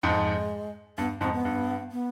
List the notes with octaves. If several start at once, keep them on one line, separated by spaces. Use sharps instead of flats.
F2 G#2 G#3
G2 B3
F2 G#2 C4
B3
G2
B3